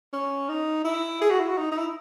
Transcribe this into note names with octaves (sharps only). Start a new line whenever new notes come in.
C#4
D#4
E4
G#4
F#4
E4
F#4
D#4
D#4
E4